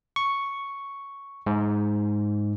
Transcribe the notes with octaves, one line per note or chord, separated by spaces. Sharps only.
C#6
G#2